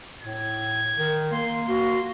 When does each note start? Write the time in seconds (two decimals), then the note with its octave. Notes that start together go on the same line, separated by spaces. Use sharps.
0.22 A2 G#6
0.98 D#3
1.31 A#3 C6
1.68 A#3 F#4 C6